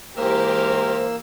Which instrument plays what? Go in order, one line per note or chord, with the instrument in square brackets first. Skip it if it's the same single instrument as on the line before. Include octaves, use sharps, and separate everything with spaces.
[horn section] G#2 G#3 A#4 [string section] E3 G4 [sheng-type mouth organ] A#3 E6 [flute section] C5